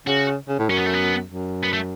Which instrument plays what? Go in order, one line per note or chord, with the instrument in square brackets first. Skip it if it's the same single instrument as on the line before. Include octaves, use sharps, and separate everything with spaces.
[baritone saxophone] C#3 [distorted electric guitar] F#4
[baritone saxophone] C#3
A2
[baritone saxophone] F#2 [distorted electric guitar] C#4
[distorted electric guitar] B3
A3
B3
[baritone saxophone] F#2
[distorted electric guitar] B3
A3